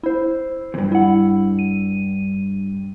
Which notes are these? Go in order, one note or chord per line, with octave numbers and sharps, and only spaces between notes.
E4 C5
E2 G2
E4 F#5
D#7